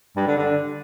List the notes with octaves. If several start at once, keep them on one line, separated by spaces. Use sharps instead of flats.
G2
D3
D3